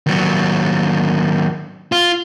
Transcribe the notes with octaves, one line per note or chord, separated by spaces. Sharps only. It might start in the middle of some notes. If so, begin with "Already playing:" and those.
D#2 F#3
F4